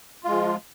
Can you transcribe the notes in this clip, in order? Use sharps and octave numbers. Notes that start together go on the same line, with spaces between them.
F3 G#3 F4